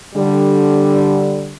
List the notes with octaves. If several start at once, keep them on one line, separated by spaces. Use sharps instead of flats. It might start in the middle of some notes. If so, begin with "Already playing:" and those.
D3 G3